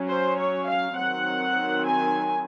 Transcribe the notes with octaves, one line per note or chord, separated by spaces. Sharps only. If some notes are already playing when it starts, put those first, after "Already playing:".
Already playing: F#3 C#4
C5
C#5
F5
D#3 F#3 C4 F#5
G#5